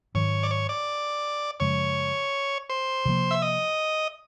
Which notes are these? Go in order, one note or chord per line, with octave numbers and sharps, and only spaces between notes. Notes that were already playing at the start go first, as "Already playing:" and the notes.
G#2 D#3 F#3 C#5
D5
C#5
D5
F#2 C#3 F3 G#3 C#5
C5
C3 F3 A#3
E5
D#5